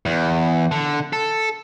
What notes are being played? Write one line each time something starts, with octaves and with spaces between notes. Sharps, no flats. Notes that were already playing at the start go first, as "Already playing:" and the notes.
E2
D3
A4